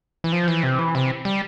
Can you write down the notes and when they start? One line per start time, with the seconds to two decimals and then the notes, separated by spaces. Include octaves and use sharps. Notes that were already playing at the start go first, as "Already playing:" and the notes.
0.24 E3
0.32 F3
0.48 E3
0.63 C3
0.79 E3
0.95 C3
1.25 G3